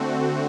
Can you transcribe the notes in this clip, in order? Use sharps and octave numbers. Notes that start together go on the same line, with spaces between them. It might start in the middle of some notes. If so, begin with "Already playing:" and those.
Already playing: D3 A3 C4 F#4